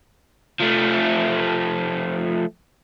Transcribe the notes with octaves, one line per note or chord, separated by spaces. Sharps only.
F3 A3